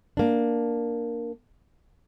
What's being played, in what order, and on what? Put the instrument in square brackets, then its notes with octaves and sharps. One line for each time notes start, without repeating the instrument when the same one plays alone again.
[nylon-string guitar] A#3 D4